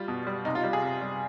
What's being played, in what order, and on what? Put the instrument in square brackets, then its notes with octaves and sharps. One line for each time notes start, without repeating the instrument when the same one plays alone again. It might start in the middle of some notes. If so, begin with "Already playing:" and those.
Already playing: [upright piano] G3 F4
B2
G3
C3 D#4
F4
G3
G#4
C3
G3